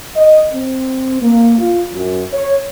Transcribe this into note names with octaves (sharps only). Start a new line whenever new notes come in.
D#5
C4
A#3
F4
F#2
C#5